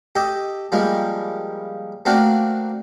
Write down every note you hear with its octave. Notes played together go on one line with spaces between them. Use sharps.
G4 A4 D#5
F3 G3 G#3 A#3
A3 A#3 C4 D4 F#4 A#4